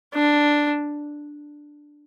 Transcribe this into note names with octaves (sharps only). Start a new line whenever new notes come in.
D4